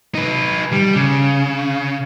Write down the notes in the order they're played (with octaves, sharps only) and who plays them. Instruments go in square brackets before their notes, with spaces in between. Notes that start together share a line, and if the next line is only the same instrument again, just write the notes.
[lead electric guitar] D#4 B4
G3
C#3